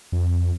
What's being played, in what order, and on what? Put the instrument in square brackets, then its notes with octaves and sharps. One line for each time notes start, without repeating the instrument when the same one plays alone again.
[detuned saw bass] F2